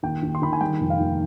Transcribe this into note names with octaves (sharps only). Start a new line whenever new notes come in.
D#2 G5
D#2
C6
D#3 B5
G#5
G3 G5
F1
F5
D#2